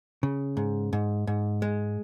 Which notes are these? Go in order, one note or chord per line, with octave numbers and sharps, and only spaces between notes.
C#3
G#2
G#2
G#2
G#3